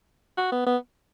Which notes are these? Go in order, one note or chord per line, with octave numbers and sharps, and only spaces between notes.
F#4
B3
B3